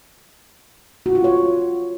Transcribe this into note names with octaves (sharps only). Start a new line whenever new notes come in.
F#4
F4
C#5